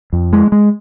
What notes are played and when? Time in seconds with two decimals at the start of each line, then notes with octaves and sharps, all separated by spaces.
0.13 F2
0.33 G#3
0.52 G#3